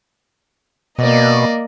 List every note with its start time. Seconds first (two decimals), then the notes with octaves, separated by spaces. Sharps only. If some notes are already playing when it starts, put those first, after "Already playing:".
0.99 B2 A#3 D5 D#5